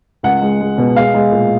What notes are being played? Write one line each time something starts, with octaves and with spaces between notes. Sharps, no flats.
C#2 F#5
G#3
G#3
B2
G#3 F5
G#3
A#2